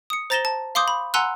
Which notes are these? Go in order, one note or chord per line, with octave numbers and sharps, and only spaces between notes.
D#6 C#7
C5 A#5 A6 A#6 E7 G7
A5
F5 C6 D6 D#6 G6
B5
F#5 G#5 A#5 C6 E6 F#6